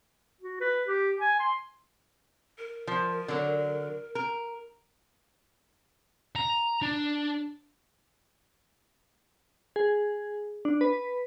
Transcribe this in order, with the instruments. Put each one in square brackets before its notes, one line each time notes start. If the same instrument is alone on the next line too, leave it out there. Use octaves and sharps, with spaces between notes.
[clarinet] F#4
B4
G4
G#5
C6
[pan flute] A#4
[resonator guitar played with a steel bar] F3
D3 F#3
A#4
[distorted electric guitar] A#5
D4
[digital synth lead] G#4
D4
B4